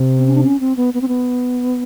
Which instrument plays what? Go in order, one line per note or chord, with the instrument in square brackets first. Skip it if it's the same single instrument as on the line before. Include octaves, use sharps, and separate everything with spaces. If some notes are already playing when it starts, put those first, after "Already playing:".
Already playing: [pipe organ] C3
[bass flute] C4
C#4
D4
C#4
C4
B3
B3
C4
B3